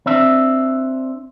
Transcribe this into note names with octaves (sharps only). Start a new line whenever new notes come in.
C4 D4 E5